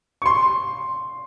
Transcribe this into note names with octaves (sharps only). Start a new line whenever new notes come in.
C#6
C6